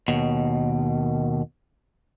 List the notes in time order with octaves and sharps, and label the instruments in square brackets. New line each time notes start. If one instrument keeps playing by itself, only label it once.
[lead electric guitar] D#2 B2